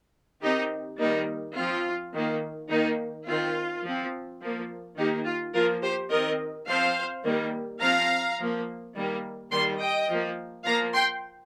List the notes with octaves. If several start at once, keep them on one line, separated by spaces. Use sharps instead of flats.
D#3 C4 D#4 G4
D#3 G3 A#3 D#4
F3 C4 F4
D#3 A#3
D#3 A#3 D#4
D#3 C4 F4
F3 C4
F3 A#3
D#3 A#3 D#4 G4
F4
F3 A#3 F4 A#4
G4 C5
D#3 C4 A#4 D#5
F3 C4 C5 F5
D#3 G3 A#3
F3 C4 F5 A#5
F3 A#3
D#3 G3 A#3
D#3 G3 A#3 G5 C6
D#5 G5
F3 A#3
F3 A#3 F5 A#5
G5 C6